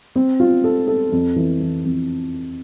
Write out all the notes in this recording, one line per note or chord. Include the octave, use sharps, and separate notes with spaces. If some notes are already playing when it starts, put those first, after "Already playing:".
C4
F4
A4
A4
F2
E3
E3
F2